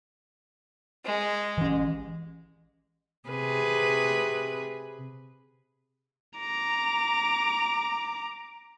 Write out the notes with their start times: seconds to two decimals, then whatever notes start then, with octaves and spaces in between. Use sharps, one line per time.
1.05 G#3
1.58 E3 C#4
3.29 C3 G#4 B4
6.38 A#5 D6